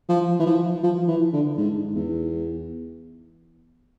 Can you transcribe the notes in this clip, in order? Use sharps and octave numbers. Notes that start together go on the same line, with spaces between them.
F3
E3
F3
F3
E3
D3
G#2
E2